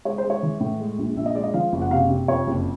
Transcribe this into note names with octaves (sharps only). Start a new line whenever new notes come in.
G#3 C#5
C5
G#3
C#5
E3
A2
G#3
A#1
A#1 E5
D#5
G#3 D5
D#5
F3 F5
F#1
F#5
C3 F5
C3
F2 C#5
F#1